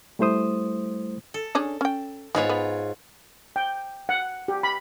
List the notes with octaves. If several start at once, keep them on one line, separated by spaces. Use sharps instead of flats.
G3 A3 E4 C5 D#6
A4
C#4 D4 G#4
C#4 G5
G#2 G#3 B3 F4 C#5
B3
G5
F#5
G4
B5